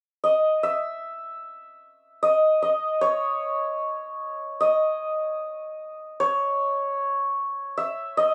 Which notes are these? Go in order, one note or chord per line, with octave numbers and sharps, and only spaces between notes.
D#5
E5
D#5
D#5
C#5
D#5
C#5
E5
D#5